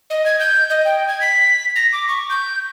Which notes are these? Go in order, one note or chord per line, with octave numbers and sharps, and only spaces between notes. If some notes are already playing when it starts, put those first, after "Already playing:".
D#5
G#6
G6
D#5
G5
G#6
B6
A#6
D6
C#6
G6